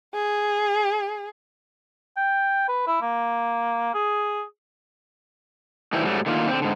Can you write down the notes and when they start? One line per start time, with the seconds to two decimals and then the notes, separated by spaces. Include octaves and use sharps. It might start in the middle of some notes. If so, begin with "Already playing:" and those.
0.14 G#4
2.17 G5
2.68 B4
2.87 E4
3.02 A#3
3.94 G#4
5.93 A2 D#3 E3 G3 E4 C5
6.05 G#2 F#3 G3 A3
6.26 D3 D#3 A3 A#3 F4
6.48 D3 C4
6.62 G#2 D3